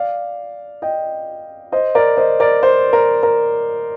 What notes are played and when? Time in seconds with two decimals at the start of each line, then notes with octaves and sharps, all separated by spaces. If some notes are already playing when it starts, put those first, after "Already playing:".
Already playing: D5 F5
0.82 D#5 G5
1.72 C5 D#5
1.95 A#4 D5
2.17 C5 D#5
2.40 A#4 D5
2.63 C5
2.93 A#4
3.23 A#4